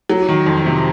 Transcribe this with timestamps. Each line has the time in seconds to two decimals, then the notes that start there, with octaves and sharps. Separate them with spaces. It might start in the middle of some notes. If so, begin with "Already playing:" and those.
0.10 F#3
0.29 D#3
0.46 F2
0.66 C3